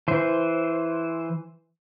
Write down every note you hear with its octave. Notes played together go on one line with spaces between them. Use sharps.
E3 C5